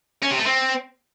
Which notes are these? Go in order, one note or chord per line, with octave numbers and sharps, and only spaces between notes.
C#4
C3
A3
C4